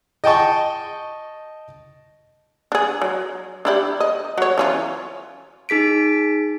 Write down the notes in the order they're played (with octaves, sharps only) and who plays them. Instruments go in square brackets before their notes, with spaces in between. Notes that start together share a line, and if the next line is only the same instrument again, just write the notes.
[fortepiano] D#5 G5 A5 C#6
[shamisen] D4 G#4
F#3
D4 E4 G4
D#5
F#3 C#5
E3 C#4 F4
[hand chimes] D#4 G#4 B6 D7